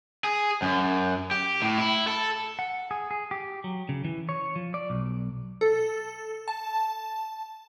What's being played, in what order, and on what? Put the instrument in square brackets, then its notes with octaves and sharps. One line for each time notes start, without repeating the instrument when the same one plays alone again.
[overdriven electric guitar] G#4
F#2
G4
A2
E4
A4
[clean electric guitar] F#5
G#4
G#4
G4
F#3
C#3
E3
C#5
F3
D5
B1
[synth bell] A4
A5